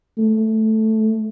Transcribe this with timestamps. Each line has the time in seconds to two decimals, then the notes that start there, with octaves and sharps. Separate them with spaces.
0.18 A3